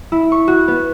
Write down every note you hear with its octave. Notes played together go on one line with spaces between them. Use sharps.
E4
C#6
F#4
B3